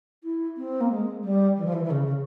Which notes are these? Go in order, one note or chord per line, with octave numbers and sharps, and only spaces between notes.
E4
C4
A#3
G#3
G3
E3
F3
E3
E3
C#3
C#3